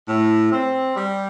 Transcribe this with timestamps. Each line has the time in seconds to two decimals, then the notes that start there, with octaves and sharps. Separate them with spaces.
0.08 A2
0.52 C4
0.96 G3